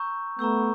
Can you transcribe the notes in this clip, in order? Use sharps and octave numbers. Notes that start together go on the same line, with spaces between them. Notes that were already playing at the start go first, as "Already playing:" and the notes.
Already playing: A#5 C#6 E6 G6
A3 B3 A#5 C#6 E6 G6